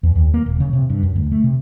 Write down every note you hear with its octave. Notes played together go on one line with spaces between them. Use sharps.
E2
D#2
A#3
D#1
C#3
C3
G2
F#2
D2
A3
C3